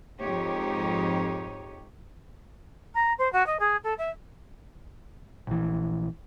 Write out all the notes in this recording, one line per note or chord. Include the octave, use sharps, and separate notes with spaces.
F2 G#2 D#4 G4 C#5
A#5
C5
F#4
D#5
G#4
A4
E5
A#1 E3